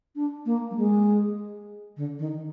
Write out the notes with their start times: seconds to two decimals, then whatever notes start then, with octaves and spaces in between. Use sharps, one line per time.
0.15 D4
0.45 A#3
0.70 G3
0.76 G#3
1.96 D3
2.18 D#3